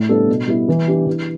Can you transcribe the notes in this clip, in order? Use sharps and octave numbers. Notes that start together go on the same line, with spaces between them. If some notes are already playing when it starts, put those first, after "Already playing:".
Already playing: A2
G3 B3 D4 A4
B2
G3 B3 E4
E3
B3 D4 G4
E3